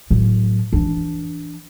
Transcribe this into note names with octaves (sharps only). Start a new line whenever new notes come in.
A2 F#3
E3 D4